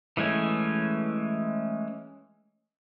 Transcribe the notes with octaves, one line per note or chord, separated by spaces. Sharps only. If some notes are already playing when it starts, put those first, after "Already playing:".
E3 G#3 A3 C#4